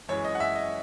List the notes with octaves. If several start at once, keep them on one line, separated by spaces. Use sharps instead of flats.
F#2 E3 G#3 C#5
D#5
F#5
E5
D#5